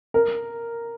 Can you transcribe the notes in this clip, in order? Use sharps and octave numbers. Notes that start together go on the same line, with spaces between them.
A#4